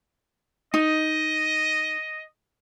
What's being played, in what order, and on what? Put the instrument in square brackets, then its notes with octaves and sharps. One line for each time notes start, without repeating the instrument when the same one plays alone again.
[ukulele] D#4 [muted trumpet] D#5